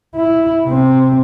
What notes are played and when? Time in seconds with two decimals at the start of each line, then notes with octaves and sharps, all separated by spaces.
0.16 E4
0.65 C3 C4